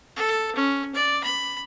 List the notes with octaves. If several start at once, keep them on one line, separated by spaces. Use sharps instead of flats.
A4
C#4
D5
B5